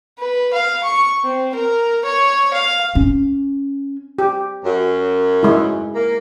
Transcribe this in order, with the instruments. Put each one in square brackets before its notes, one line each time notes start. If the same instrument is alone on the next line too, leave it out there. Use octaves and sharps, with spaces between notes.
[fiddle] B4
F5
C#6
C4
A#4
C#5
F5
[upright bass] C#4
[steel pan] G4
[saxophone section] F#2
[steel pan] G#3 E4
[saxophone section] A#3